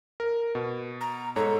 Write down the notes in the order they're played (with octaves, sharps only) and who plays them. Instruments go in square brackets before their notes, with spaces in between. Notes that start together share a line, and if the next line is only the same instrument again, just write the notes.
[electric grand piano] A#4
B2
[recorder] A#5
[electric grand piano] G#2 C#5 A#5 [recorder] A4